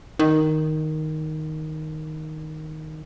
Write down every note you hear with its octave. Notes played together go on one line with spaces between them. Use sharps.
D#3